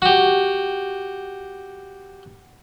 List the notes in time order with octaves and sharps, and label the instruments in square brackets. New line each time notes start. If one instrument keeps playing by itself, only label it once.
[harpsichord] F#4 G4